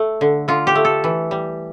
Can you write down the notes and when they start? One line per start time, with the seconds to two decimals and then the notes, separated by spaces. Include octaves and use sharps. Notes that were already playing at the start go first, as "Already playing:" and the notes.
Already playing: A3
0.21 D3
0.48 D3 F4
0.67 G4
0.75 A3
0.85 A4
1.04 E3
1.31 G3